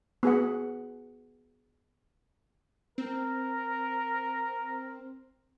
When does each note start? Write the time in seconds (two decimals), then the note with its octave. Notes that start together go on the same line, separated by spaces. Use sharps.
0.23 B3 G#4 F#5
2.98 C4 A#4